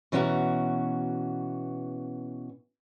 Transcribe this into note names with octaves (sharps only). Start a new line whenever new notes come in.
B2 E3 C#4 F#4 A5 A#5